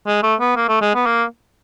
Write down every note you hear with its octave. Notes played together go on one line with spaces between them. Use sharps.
G#3
A3
B3
A#3
A3
G#3
B3
A#3